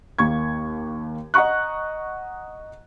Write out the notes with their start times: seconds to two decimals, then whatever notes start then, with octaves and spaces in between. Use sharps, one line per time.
0.18 D#2 A#3 C#6 G#6
1.34 D#5 F#5 A#5 C#6 F#6